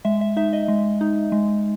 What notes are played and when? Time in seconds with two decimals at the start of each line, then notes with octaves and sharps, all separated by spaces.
0.05 G#3 E5
0.21 E5
0.37 D#4 E5
0.53 D#5
0.68 G#3
1.01 D#4
1.32 G#3